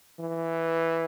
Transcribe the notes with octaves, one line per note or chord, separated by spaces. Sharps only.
E3